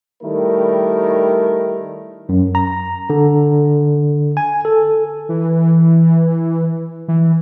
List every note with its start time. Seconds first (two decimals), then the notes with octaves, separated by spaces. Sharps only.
0.23 D#3 G3 A3 E4 A#4
2.29 F#2
2.55 A#5
3.10 D3
4.37 G#5
4.65 A4
5.29 E3
7.08 E3